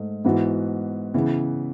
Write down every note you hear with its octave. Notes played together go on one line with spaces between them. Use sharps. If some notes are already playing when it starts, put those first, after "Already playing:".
Already playing: G#2 A3
G#2 E3 B3 F#4
C#3 E3 B3